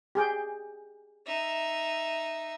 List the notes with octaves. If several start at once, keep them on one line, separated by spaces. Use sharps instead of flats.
G4 G#4 G5
D#4 E5